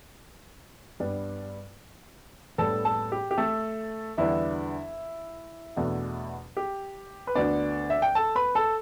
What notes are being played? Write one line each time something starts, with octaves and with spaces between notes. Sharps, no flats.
G2 G3 B3 D4
A2 G3 B3 D4 A4 A5
A4 A5
G4
G4
A3 A4
E2 D3 G3 B3 D4 E4
E2 B2 A3 D4
G4
B4
D2 D3 B3 D4 D5
E5
G5
A4 A5
B4 B5
A4 A5